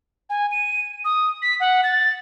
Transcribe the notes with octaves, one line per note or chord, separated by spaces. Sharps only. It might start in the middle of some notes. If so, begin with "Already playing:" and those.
G#5
D#7
D#6
B6
F#5
A6